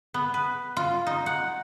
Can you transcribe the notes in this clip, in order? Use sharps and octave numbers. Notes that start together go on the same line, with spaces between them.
B3
B4
F4
D#4
F#5